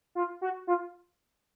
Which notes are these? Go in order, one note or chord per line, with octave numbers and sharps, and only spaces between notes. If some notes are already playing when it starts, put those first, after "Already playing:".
F4
F#4
F4